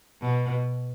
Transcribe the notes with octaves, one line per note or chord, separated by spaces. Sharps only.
B2